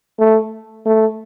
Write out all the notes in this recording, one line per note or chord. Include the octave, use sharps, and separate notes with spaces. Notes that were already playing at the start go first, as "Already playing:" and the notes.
A3
A3